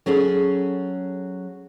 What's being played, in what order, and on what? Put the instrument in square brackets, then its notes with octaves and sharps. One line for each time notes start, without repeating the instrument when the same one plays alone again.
[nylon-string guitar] F#3 C#4 G#4 A4